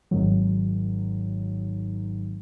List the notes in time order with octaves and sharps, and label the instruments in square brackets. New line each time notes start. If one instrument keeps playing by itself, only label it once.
[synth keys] G#1 G#2 D#3 F#3